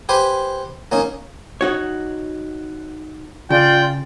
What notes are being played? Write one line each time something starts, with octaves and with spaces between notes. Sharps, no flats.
G4 B4 C5 G#5 D6
A#3 C#4 D#4
D#4 F#4 C#5
C#3 F4 D5 G5